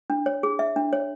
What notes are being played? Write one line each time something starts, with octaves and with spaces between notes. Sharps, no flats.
D4
C#5
G#4
E5
D4
C#5